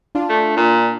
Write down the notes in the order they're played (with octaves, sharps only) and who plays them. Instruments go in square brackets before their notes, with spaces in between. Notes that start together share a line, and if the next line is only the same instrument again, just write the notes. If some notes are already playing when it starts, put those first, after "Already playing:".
[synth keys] D4 F4
[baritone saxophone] A3
A#2